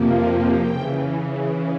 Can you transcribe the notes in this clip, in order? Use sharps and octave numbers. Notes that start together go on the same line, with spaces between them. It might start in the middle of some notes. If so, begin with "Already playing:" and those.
Already playing: F2 C3 F3 A#3
C#3 E3 G5